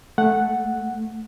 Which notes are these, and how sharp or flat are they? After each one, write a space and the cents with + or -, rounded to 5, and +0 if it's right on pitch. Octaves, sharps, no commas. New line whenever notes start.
A3 -5 F#5 +0